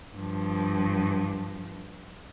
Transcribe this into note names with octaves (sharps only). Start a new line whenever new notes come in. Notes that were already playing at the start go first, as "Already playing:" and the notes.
G2 F3